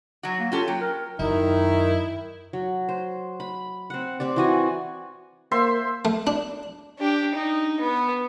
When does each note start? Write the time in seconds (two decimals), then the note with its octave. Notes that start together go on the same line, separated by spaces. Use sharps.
0.23 F#3 F#4
0.40 A#3
0.52 C#4 F4 G4 A4
0.68 F#3 G5
0.81 A#4
1.19 F#2 D#3 D#4 E4
2.53 F#3
2.89 C5
3.40 B5
3.90 C4 F#5
4.20 C4 G4 D5
4.36 E3 F#4 G#5
5.52 A#3 C5 E5 C6
6.05 A3
6.27 D4
6.99 D4 G4
7.35 D#4
7.80 B3